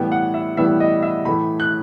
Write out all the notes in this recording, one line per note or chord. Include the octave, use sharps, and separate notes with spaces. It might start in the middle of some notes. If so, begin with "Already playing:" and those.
Already playing: A2 E3 G3 B3 G5
F#5
E5
A2 E3 G3 B3 E5
D#5
E5
A2 E3 A3 B5
F#6